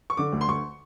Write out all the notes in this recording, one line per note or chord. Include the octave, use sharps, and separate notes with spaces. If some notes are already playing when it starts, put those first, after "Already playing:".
C#6
D3 D6
D2
C6
D2 C#6